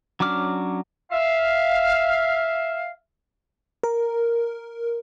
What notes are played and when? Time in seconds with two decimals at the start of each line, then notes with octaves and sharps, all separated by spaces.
0.20 F#3 C#4 D4 D6 F6
1.11 E5 F5
3.83 A#4